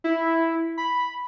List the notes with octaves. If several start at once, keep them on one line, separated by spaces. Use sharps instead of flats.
E4
B5